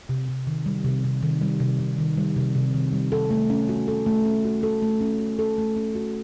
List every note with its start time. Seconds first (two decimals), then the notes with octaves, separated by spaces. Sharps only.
0.09 C3
0.28 C3
0.47 D#3
0.66 G3
0.84 C3
1.04 C3
1.23 D#3
1.41 G3
1.60 C3
1.80 C3
1.98 D#3
2.17 G3
2.36 C3
2.55 C3
2.74 D#3
2.93 G3
3.12 A4
3.31 A3
3.50 C#4
3.69 F#4
3.88 A4
4.06 A3
4.25 C#4
4.45 F#4
4.63 A4
4.82 A3
5.01 C#4
5.20 F#4
5.39 A4
5.58 A3
5.77 C#4
5.95 F#4